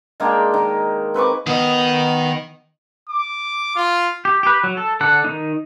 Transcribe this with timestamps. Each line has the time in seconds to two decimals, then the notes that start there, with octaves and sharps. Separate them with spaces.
0.20 G#3 A#3 D4 G5
0.54 D#3
1.14 C4 B4 C#6 D6
1.46 D#3 B3 D#5
3.10 D6
3.76 F4
4.25 G4
4.43 G4 B4
4.64 F#3
4.77 A4
5.01 D3 D4 A4 F#5 F#6
5.24 D#3 C4 D#4